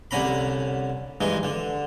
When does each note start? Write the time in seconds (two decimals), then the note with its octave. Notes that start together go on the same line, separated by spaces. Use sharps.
0.11 C2 D3 C#4 A#5 B5
1.21 G2 E3 G#3 D#4
1.43 D3